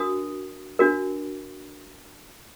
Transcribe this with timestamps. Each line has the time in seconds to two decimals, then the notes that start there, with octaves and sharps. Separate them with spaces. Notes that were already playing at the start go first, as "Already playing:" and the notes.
Already playing: D4 F#4 A#4 D#6
0.79 D4 F#4 A#4